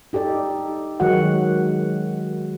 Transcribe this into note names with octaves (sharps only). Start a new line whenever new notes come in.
D#4 G4 A4 D5
D#3 F#3 G#3 F#4 F#5